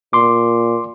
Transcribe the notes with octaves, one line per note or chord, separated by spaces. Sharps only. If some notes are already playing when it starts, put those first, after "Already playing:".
A#2 C6 D6